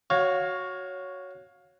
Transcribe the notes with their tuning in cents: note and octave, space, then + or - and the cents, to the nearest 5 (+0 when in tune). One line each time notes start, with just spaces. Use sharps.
F#4 +0 C#5 +0 F5 +20